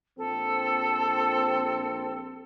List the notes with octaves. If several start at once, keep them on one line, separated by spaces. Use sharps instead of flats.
A#1 F3 C4 A4